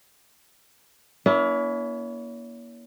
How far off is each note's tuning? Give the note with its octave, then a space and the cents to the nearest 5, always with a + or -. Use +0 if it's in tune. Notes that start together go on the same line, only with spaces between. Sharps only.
A#3 +30 C#4 +40 E4 -10